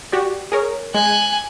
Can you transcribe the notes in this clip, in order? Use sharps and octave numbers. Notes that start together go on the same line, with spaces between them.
F#4 G4 D5
G#4 A#4 C#5
G#3 G#5 F#6